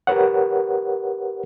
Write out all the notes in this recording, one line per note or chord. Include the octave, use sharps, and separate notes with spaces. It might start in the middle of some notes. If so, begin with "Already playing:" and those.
G4 A#4 B4 C#5 F#5